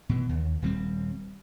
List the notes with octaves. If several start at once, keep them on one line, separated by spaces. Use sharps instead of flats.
B2 E3
D#2
D#1 G2 G3 C4